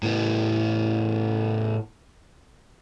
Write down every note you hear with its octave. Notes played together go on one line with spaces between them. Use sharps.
A2 B3